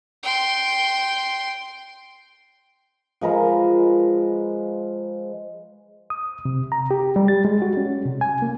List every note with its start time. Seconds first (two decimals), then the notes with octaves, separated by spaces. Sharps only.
0.23 G5 C6
3.21 F3 G#3 A#4 B4
6.10 D#6
6.45 C3
6.72 A#5
6.91 G4
7.16 G3
7.28 A6
7.45 G#3
7.62 F#4
7.77 C#4
8.05 C3
8.21 G#5
8.42 A#3